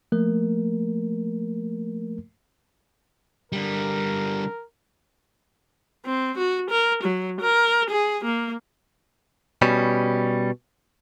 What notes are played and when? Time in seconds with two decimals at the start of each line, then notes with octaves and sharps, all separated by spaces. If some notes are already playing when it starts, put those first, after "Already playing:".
0.12 F3 A3 A#3 A#4
3.52 D3 G3 A#4
6.05 C4
6.38 F#4
6.71 A#4
7.04 F#3
7.41 A#4
7.90 G#4
8.25 A#3
9.62 B2 G3 C#4